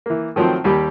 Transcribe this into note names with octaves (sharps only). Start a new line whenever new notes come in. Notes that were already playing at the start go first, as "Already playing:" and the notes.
E3 A#3
D#3 F3 F#3 A3 C4
D#2 G3 G4 B5